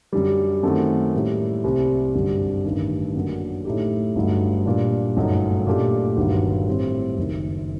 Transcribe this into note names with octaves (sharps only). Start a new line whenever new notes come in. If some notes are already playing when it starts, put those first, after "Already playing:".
F#2 D3 G3
F#2 D#3 A3 C4 F#4
A2 G3 A#3
C2 C3 G3 C4
G1 F#2 D3 G3 C4
A1 G2 D#3
F#2 D3 F#3 A#3
A2 A3 D#4 G4
G1 G2 F#3 A3 D#4
A#2 G3 D4
G1 F#2 F#3 A3 D#4
A#2 A3 D4 G4
G1 G2 D#3 F#3
A2 G3 C4
F#1 F#2 D#3